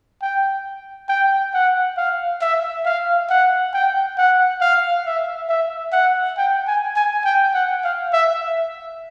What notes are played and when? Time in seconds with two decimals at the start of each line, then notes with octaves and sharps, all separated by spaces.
0.22 G5
1.09 G5
1.54 F#5
1.97 F5
2.41 E5
2.85 F5
3.30 F#5
3.74 G5
4.18 F#5
4.61 F5
5.06 E5
5.49 E5
5.93 F#5
6.38 G5
6.67 G#5
6.96 G#5
7.25 G5
7.54 F#5
7.84 F5
8.13 E5